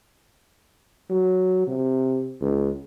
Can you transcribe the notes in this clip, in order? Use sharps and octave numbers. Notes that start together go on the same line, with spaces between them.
F#3
C3
C#2